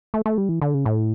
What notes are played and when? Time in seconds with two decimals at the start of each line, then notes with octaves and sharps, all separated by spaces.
0.14 A3
0.26 A3
0.38 G3
0.49 E3
0.62 D3
0.74 C#3
0.86 A2